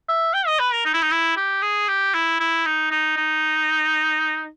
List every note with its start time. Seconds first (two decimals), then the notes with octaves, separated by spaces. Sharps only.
0.08 E5
0.34 G5
0.47 D#5
0.59 B4
0.72 A#4
0.85 D#4
0.94 E4
1.02 D#4
1.11 E4
1.37 G4
1.62 G#4
1.88 G4
2.14 E4
2.40 E4
2.66 D#4
2.91 D#4
3.17 D#4